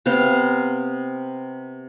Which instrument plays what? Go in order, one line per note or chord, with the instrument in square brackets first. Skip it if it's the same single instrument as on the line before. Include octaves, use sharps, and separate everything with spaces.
[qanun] C3 B3 C5 F5